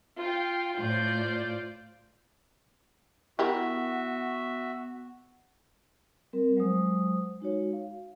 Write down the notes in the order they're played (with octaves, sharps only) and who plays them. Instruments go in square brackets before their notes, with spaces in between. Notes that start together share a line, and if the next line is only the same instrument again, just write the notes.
[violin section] F4 F5 G5
[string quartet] A2 G6 [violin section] F4 C5 D5
[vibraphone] B3 F#5 [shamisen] E4 G4 A#4 [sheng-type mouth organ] F#4 E5
[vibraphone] G3 C4 A#4
F#3 G#3 C5 D#6
G#3 D#4 F#4 C#5
F5